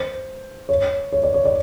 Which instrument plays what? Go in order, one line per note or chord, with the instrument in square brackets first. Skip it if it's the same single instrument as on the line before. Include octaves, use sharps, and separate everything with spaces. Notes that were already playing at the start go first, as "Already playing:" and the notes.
Already playing: [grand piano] C5
C#5
C#5
D5
C#5
D5